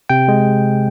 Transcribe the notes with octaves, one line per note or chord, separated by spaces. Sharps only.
C3 G5
G#3